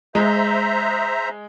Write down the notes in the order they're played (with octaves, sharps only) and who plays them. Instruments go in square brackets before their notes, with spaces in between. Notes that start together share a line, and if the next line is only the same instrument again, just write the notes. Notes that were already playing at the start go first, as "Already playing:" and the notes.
[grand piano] G#3 [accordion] C5 E5 A#5